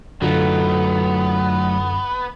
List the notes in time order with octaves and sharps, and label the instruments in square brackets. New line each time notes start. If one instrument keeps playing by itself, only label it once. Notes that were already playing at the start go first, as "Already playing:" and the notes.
[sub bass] F#2 [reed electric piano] D3 F4 A4 [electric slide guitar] F#3 A3 D#4 [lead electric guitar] B3